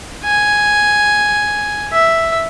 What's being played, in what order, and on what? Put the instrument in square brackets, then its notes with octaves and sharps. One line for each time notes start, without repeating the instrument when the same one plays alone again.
[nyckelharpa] G#5
E5